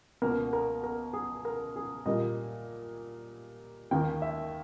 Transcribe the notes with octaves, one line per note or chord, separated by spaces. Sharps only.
C#2 B2 A#3 A#4
A#4
A#4
G#4
A#4
G#4
A#2 G3 A#3 D#5
D#2 D#3 A#3 G5
E5